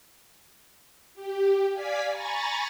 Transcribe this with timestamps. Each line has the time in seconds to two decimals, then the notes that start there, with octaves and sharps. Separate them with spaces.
1.14 G4
1.73 D5 F5 G#5 G#6 B6
2.11 G#5 A#5 B5 C#6 A6